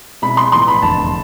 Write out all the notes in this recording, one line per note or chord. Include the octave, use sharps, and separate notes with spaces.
B2 G#3 C4 E4 B5
C6
A1 A2 F3 B3 C6
B5
F1 E2 D3 A3 A5